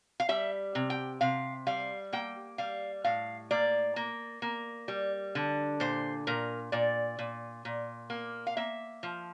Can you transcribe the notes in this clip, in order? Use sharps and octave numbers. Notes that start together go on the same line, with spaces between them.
F5
G3 E5
C3
G5
C3 F5
G3 F5
A#3 G5
G3 F5
A2 F5
A#3 D5
A#3
A#3
G3
D3
A#2 C5
A#2 A#4
A#2 D5
A#2
A#2
A#3
F5
A#3 E5
F3